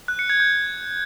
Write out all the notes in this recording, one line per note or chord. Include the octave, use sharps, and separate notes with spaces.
F#6
C#7
G#6
G6